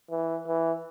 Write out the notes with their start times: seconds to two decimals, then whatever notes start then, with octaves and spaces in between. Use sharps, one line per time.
0.11 E3
0.47 E3